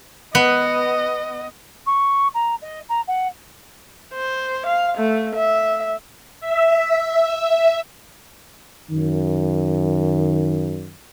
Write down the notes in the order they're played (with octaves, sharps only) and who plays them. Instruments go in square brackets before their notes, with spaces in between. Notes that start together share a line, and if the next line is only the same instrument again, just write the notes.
[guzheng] B3 [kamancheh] D#5
[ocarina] C#6
A#5
D#5
A#5
F#5
[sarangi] C5
F5
A3
E5
[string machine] E5
[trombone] F#2 [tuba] D#3